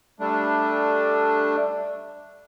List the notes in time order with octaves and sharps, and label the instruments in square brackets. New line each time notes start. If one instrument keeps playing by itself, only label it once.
[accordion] G3 A3 D4